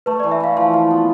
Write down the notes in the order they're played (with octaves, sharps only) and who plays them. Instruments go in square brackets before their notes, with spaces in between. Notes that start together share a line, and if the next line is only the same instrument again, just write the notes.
[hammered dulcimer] A3 [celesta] B4
[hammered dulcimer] E3 [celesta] D5
[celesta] E5
[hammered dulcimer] E3 [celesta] F5
[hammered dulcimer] F3 [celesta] F5
[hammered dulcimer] F4
B3